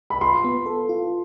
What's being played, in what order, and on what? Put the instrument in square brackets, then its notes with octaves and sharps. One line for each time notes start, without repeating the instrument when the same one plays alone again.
[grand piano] B5
[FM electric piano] F4 [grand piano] C6
[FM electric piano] B3
A4
F4